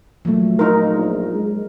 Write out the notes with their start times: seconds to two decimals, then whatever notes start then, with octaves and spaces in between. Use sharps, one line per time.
0.25 A#2 F3 F#3 A3
0.59 D#4 A#4
0.94 A#1
1.35 G#3